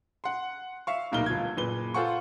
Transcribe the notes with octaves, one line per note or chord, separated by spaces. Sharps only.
F#5 C6
E5 F5 C#6
D1 B2 A#3 D#4 A#4 G7
G1 F4 G#6
F#1 A#2 B4 G7
F4 A4 C5 F#5 G#5 C#6